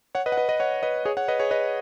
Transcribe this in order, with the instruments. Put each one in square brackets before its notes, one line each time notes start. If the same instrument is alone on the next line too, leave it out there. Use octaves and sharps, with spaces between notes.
[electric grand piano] C#5 F#5
B4 D#5
F#5
B4 D#5
B4 D#5
C#5 F#5
B4 D#5
G#4 C#5
C#5 F#5
B4 D#5
G#4 C#5
B4 D#5